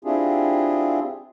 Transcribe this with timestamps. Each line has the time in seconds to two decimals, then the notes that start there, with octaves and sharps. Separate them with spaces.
0.05 C4 D4 E4 F4 G4 G#4